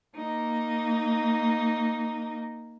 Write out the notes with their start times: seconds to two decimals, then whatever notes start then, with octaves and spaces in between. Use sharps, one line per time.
0.16 A#3 D#4